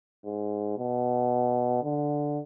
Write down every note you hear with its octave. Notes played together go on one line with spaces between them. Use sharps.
G#2
B2
D3